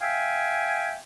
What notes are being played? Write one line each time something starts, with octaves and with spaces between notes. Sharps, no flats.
E5 F5 G5 G#5